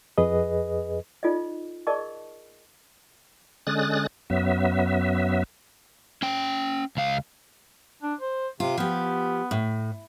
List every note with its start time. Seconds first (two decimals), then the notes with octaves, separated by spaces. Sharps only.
0.18 F2 G#4 B4 D#5
1.23 D#4 F4 A4 D5 D#5
1.87 G#4 A#4 D5 D#5 A5 C#6
3.67 D3 G#3 C#4 D#6 F#6 A6
4.30 F#2 F#3 B3 E5
6.22 C#4 G5
6.97 C#2 F5
8.02 D4
8.20 C5
8.60 C3 F4
8.78 F3 B3 G4
9.51 A2